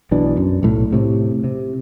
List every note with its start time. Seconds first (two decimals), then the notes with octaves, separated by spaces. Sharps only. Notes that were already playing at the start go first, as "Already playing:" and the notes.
0.11 B1 B2 E3 D4
0.37 F#2
0.63 B1 A2
0.93 A2 C3
1.44 C3